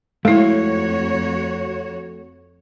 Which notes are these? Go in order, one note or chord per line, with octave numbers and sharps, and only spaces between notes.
F2 G#3 A3 E4 F#4 C#5